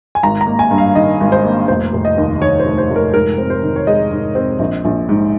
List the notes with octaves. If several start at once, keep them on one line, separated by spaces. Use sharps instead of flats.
G#5
G#1 A#5
A#5
A#3
G#5
G2
F5
D#3 D#5
G#1
C5
A#3
F1 C5
F1
D#5
D#2
D#3 C#5
C5
F1
C5
F1
A#4
G#2 A#4
C4
C5
D#3
C#5
G#3 D#5
G#2
C4
A#1
A#1
G#2